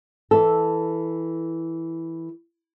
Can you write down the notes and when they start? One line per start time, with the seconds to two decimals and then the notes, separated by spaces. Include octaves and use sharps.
0.31 E3 A4